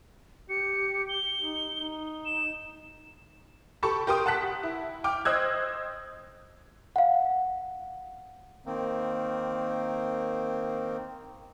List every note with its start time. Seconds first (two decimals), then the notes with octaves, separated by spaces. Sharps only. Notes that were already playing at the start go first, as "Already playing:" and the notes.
0.50 G4 C#7
1.09 G7
1.41 D#4
1.79 D#4
2.26 E7
3.83 G4 A4 A5 B5 C#6
4.07 G4 A#4 G5 C6 D#6
4.26 F#5 A5 F#6 B6
4.63 E4
5.04 G5 D6 F6
5.25 C5 D#5 D#6 E6 F#6 G#6
6.96 F5 F#5
8.66 D#3 A#3 C4